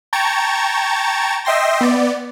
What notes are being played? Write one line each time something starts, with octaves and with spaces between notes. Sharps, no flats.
G5 A5 A#5 C#6 G#6 A6
D#5 E5 G5 C6 A#6
B3 D5